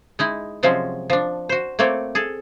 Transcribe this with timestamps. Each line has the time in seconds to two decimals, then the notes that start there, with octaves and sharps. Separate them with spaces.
0.19 G#3 D#4 E4
0.63 C3 F3 F#3 G#3 C4 C#4
1.10 F3 D4
1.49 F#4 C5
1.79 A3 A#3 C4 C#5 D5
2.15 G#4 A4